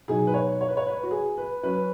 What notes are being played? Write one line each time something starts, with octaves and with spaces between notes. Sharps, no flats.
B2 F#3 D#4 G#4
B4
C#5
C#5
B4
C#5
B4
F#4
G#4
B4
F#3 C#4 B4